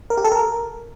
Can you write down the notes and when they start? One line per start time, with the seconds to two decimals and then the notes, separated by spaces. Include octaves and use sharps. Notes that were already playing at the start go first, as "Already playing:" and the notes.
0.10 A#4
0.17 G4
0.25 A4
0.32 A#4